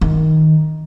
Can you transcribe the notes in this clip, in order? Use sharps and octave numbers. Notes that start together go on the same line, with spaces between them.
D#3